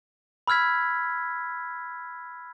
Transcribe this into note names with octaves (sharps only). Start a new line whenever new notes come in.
B5 E6 F6 G#6 B6